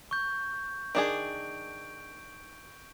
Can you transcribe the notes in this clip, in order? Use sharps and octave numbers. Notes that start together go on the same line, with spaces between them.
C#6 G6
D#3 D4 G#4 D7